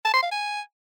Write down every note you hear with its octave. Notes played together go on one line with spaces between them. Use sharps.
A5
C6
F5
G#5